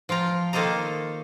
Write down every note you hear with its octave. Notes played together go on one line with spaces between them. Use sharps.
F3 F4 G5 A#5
D#3 A#3 A4 C5 D#5 A#5